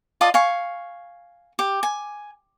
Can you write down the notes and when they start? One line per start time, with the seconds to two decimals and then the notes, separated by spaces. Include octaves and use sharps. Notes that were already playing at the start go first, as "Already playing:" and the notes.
0.21 F4 D5 D#5 A5
0.34 F5 G#5 C#6
1.59 G4
1.83 G#5